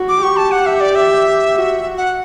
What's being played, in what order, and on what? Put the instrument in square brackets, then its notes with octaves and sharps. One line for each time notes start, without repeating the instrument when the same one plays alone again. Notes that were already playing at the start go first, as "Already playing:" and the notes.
Already playing: [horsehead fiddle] F#4
[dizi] D6
[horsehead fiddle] G4 [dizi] C#6
[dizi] A5
F#5
E5
D5
E5
[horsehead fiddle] F#4
[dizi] F#5